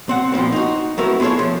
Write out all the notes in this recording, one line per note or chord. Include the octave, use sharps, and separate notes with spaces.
C4 F#5
A#2 F3 B3 C4
D#4 F#4
F#3 A3 C4 E4 A#4 B4
B3 F4 G#4 A4 C#5
F3